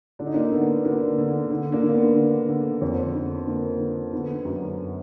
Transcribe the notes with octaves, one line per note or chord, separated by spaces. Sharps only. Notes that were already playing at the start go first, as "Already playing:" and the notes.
D3 D4
D#4
A#3 D4
D3 B3
D3 A#3 D4
D3
D3
A#3 D4
D3 A#3
B3
D3
D3
F2
D3
D3 A#3
D3
D3 B3
F#2